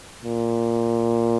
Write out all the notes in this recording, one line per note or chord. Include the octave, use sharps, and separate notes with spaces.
A#2